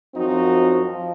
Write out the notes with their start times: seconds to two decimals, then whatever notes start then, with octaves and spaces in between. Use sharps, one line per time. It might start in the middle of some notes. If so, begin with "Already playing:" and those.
0.14 F#2 F3 C4 D#4 F#4
0.84 F3